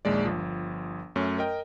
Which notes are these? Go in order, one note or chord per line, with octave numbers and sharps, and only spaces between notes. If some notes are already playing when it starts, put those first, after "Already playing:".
A#1 D#2 G#3 D5
G1 F3
F#2 A3 C#4
A#4 D#5 G5